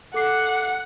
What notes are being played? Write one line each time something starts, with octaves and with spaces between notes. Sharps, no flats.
A4 F#5 D6 C7